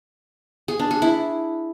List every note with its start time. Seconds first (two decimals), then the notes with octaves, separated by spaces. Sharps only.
0.68 G#4
0.79 D4
0.91 G#4
1.02 E4